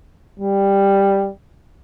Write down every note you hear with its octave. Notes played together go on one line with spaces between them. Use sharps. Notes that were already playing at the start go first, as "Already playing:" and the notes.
G3